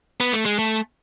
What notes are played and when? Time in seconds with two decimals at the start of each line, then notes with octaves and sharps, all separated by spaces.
0.20 B3
0.32 A3
0.46 G#3
0.59 A3